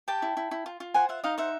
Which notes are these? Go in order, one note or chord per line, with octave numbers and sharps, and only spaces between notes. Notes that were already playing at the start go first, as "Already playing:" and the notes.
G4 G5 A5
E4
E4
E4
F4
F4
C5 F#5 G#5
F4 E5 F#5
D#4 D#5 F5
C5 E5 F#5